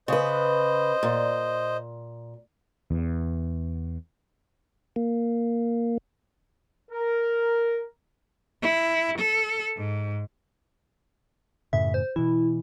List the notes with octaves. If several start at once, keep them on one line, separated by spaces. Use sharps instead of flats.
C#3 B4 C5 D#5
A#2
E2
A#3
A#4
E4
A4
G#2
F#2 A2 C#3 E5
C5
B2 E3 E4